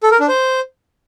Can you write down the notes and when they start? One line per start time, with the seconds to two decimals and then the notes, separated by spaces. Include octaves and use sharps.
0.03 A4
0.12 A#4
0.20 D4
0.28 C5